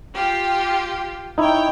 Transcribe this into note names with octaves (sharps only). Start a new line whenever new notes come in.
F4 G4 G5
D#4 E4 C#5 G5